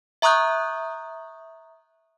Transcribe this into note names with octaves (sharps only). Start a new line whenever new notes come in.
E5 A#5 C#6 D#6 F#6 G6